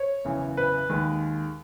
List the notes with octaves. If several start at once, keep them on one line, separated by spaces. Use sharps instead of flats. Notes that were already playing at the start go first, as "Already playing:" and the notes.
Already playing: C#5
F#1 E2 C#3 E3
B4
D#2 D#3 G#3